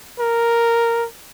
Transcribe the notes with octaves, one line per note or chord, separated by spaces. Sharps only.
A#4